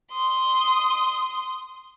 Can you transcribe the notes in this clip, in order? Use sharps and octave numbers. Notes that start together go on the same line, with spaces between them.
C6 D#6